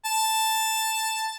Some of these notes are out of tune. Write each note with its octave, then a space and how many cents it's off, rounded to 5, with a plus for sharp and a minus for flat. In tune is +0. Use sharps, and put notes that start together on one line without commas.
A5 +5